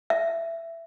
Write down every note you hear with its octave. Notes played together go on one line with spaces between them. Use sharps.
E5